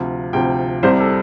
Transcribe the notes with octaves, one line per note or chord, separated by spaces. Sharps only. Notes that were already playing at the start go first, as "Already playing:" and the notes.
Already playing: D2 C3 F3
D2 C3 F3 G5
C2 C3 G3 C5
A4